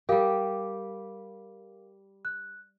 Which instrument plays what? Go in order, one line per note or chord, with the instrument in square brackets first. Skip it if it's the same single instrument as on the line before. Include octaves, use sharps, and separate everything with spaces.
[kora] G3 G4 [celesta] A#4 F5
[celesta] F#6